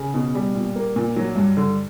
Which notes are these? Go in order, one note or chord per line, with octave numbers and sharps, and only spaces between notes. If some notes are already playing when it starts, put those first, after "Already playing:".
Already playing: C#3
B2
G3
A#2
A#3
A#2
F#3
G2
D3